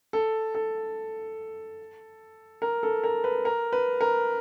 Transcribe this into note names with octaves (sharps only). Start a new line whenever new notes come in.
A4
A4
A#4
A4
A#4
B4
A#4
B4
A#4